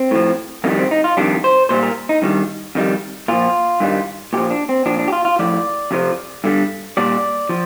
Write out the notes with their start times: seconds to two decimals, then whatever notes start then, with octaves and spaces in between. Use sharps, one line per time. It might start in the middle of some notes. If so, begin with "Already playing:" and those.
Already playing: C4
0.11 A2 F3
0.64 F2 D#3 G3 A#3
0.78 C4
0.91 D#4
1.04 F4
1.17 F2 D#3 G3 D4
1.44 C5
1.69 A#2 G3 C5
1.83 A#4
2.09 D#4
2.22 G2 D#3 G3
2.75 F2 D#3 G3
3.28 A#2 F3 F4
3.80 G2 D#3 G3
4.33 A#2 F3 G4
4.51 D4
4.69 C4
4.86 A#2 F3 D4
4.99 D4
5.08 G4
5.12 F4
5.25 F4
5.39 A2 F3 D5
5.91 F2 C3 F3
6.44 G2 D3 G3
6.97 A#2 G3 D5
7.49 F3